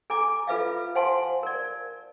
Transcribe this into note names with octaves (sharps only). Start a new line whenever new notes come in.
A4 G#5 A#5 D6
F4 A4 B4 E5 F5
C5 F5 F#5 G#5 A5 C6
A#4 D5